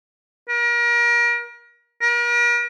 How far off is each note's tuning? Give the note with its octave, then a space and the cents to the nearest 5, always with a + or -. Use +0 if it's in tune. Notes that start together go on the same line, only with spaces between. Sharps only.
A#4 +35
A#4 +40